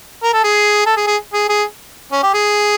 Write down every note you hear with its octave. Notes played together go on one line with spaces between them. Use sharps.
A#4
A4
G#4
A4
G#4
G#4
G#4
G#4
C#4
G4
G#4